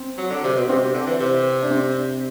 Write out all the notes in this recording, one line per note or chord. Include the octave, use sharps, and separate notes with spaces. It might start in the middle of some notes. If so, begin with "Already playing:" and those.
Already playing: C4
F#3
D3
C3
B2
C3 C4
C3
D3
E3
C3
D4
C4